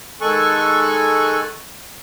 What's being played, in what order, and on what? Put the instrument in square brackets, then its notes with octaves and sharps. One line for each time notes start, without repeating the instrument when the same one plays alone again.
[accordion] D#3 G#3 A4 G#5 C#6 F#6